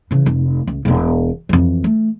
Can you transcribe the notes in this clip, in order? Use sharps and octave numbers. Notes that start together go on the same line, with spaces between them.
C#3 E3
F1
C#2
E1 B3
F2 E3
A3